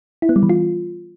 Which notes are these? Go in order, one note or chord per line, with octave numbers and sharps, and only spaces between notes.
E4
B3
G3
E3
F4